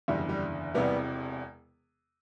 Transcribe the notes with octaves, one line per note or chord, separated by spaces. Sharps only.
F#1 E2 D3 G3
G3
E1 E2 C3 G3 B3